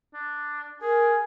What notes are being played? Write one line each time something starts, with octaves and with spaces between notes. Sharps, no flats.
D4
G#4 A#4 G#5